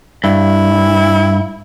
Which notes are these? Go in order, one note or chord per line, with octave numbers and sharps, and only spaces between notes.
G2 E4